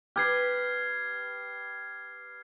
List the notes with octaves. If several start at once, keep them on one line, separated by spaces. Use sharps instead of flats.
G4 B4 F6 G#6 C7